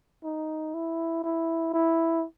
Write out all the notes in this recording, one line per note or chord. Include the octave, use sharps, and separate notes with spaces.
D#4
E4
E4
E4